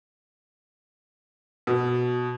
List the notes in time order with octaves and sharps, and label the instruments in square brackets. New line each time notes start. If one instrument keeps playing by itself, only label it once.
[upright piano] B2